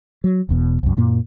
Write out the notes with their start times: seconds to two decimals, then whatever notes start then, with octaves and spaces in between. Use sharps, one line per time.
0.24 F#3
0.49 E1 E2 B2
0.83 C2 F#2
0.97 F#2 A#2 A#3